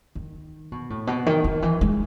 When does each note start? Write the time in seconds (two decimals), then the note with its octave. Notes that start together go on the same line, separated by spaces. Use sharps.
0.15 D#3
0.72 B2
0.90 A2
1.07 B2
1.26 D#3
1.44 D#3
1.62 E3
1.81 G#3